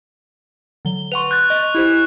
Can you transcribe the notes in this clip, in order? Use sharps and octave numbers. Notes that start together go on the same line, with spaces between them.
D3 F#3 G7
B4 F#5 C6 C#6 F7
F#6 G6 A6
D#5
E4 G4 C5